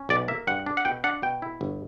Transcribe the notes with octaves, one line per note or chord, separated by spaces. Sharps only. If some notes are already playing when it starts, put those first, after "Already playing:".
Already playing: C#4
B1 D5
A#3 E5
G2 F#5
D4
F#5
B2 G5
D4 F#5
B2 G5
E4
G1